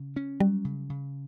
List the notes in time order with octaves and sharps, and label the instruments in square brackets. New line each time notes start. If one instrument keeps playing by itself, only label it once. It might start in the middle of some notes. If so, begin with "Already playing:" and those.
Already playing: [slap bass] C#3
C#4
[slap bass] F#3 [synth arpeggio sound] G3
[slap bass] C#3
C#3